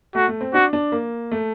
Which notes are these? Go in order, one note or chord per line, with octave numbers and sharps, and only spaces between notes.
A3 F#4
A3
C4
D4 F#4
D4
A#3
A3